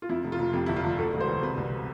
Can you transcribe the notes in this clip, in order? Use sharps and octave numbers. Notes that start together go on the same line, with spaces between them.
F4
F2 E4
F1
F4
F1
F2 G4
G1 E4
F4
G1
D2 A4
E1
C5
E3
C3 B4
C2